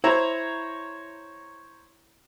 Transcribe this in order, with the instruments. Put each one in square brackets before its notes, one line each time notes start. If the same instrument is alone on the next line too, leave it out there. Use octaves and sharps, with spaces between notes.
[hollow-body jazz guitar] E4 [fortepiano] C5 C#5 A#5